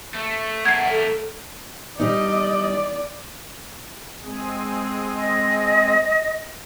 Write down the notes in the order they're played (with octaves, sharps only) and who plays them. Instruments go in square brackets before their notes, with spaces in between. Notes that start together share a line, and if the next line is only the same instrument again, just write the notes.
[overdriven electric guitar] A3
[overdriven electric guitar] A3 A#4 [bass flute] F#5 [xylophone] G#6 C7
[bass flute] A4
[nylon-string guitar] G3 D#4 [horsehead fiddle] D5 [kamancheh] D#5
[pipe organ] G#3 C4 G#4
[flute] D#5